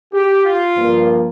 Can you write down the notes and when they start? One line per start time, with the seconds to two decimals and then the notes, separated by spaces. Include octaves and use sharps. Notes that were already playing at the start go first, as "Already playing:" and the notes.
0.14 G4
0.46 F4
0.77 G2 F3 A#3